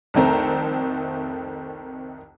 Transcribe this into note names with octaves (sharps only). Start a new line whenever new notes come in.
C2 F2 D#3 A3 C4 A#5